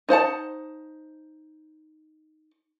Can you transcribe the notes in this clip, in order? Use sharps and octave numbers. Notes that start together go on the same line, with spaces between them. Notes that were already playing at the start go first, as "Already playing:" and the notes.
D#4 C5 F#5 A5